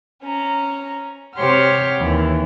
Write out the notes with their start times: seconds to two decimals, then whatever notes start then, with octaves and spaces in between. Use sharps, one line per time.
0.24 C#4 A#5
1.36 C3 G4 C5 C#5 F#5 F6
1.98 D#2 E3